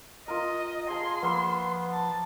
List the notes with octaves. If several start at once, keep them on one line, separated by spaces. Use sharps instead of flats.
F4 A#4 D#5
G#4 F5 A5 C6
F3 A#3 B3 E6
A5